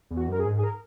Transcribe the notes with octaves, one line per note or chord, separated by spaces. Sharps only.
E2
F#4
F#2 A#4
G#4
G#2
G#4
A#4